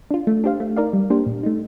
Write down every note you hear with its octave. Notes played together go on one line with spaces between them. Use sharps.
D4 F4
A3
D4 G4 C5 F5
A3
D#4 A#4 D5 F5
G3
A#3 D4 G4 C5
A#2
A3 D#4